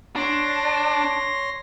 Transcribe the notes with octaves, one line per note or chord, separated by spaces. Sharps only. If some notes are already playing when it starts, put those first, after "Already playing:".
D4 C#5 C6 A#6